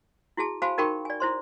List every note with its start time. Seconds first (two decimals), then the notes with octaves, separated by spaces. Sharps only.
0.37 E4 F#4 G#4 A5
0.62 F#4 C5 F5 G#5 A5 B5
0.78 D#4 F#4 A#4 G5 B5 C#6
1.05 D5 G#5
1.20 E4 C5 C6